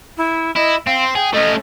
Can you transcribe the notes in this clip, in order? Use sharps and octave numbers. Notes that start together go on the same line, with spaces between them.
E4
E4 D#5
C4 F5
G#4 G5
A3 C#4 D#5